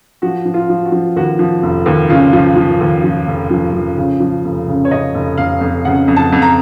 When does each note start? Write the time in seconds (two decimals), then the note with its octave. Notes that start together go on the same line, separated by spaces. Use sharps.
0.22 F3 F#4
0.46 F3
0.54 F4
0.70 F3
0.85 F#4
0.92 F3
1.16 D#2 F#4
1.39 F3
1.63 F1
1.86 D#2
2.09 C#3 F4
2.33 F3
2.56 F3
2.81 D#2
3.04 F3
3.27 F1
3.51 F3
3.74 F3
3.97 C#3
4.20 F3
4.45 F1
4.68 C#3
4.85 C#5
4.91 C#3 D#5
5.14 F1
5.37 F1 F5
5.61 F2
5.85 C#3 F#5
6.08 F2
6.17 A5
6.32 F2
6.42 A#5